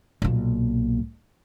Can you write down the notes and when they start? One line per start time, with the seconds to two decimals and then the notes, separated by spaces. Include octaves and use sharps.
0.22 B1 A#2